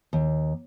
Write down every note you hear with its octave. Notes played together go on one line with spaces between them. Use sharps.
D#2